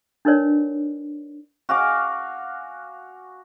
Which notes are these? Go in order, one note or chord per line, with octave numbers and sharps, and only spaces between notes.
D4 D#4 A#4 B4 C#5 D5
F#4 F5 G#5 D6